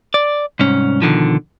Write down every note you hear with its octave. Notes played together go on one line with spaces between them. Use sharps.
D5
C2 G#2 C#4
B2 D3 D#3 F3